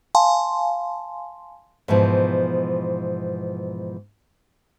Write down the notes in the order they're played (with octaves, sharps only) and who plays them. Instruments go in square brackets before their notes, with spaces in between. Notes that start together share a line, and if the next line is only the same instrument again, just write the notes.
[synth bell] F5 G#5 A5 C6
[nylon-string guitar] G#2 B2 E3 F3